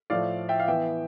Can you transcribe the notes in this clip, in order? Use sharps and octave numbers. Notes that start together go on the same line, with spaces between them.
A2 F3 A3 D5 F5
E5 G5
F5
E3 B3 E5 G5